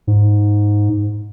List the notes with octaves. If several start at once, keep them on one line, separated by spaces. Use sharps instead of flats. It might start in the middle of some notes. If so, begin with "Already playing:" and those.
G#2